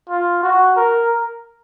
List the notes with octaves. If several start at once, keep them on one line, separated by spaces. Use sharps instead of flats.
F4
F#4
A#4